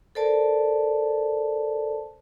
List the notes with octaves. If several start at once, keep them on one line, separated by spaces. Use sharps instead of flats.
A4 A#4 C5 D5 A5